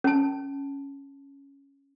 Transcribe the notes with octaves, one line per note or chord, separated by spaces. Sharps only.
C#4 A5